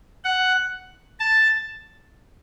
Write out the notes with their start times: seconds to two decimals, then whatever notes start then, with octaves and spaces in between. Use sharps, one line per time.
0.24 F#5
1.20 A5